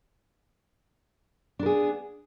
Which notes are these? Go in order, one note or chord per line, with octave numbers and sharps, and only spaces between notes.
B3 D4 G#4 A#4